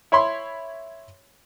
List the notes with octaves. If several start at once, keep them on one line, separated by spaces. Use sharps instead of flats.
E4 C#5 B5 C6